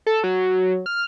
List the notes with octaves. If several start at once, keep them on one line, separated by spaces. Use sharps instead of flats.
A4
F#3
F6